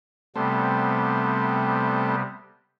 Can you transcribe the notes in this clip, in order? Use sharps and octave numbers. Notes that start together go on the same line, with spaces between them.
C3 G3 A3 B3 C4